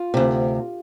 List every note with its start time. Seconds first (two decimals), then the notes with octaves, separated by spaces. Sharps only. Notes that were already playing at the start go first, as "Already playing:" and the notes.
Already playing: F4
0.14 D2 C3